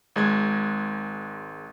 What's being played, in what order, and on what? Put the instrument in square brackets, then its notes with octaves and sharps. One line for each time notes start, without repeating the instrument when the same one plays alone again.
[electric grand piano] G#1 G#3 G#6